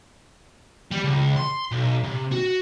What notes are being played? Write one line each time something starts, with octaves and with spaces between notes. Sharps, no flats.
G3
C#2
C6
B1
C3
F#4